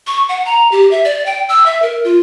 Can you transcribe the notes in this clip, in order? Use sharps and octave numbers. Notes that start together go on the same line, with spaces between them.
C#6
F#5
A#5
G4
E5
D5
G5
E6
E5
A#4
F4